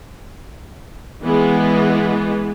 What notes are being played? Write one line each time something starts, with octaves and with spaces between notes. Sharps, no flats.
E3 G#3 B3